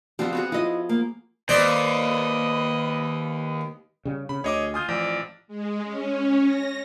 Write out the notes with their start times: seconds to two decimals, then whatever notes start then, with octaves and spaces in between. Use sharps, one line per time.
0.19 F3 G3 B3 C4
0.33 B3 F#4 G#4
0.52 F3 E4 D#5
0.89 A#3
1.49 D#2 B4 C5 D5 D#5 D6
4.05 C#3 G3
4.29 C#3 B5
4.44 D2 G#4 C#5 D#5 D6
4.74 F4 G#5 D#6 G6
4.89 A1 F3 D5
5.48 G#3
5.84 C#4
6.45 A#6